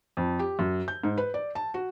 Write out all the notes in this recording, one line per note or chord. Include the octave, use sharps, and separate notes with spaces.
F2
G4
F#2
G6
G#2
B4
D5
A5
F#4